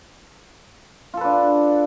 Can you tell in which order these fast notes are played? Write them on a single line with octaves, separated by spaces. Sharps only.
F4 A4 B4 D4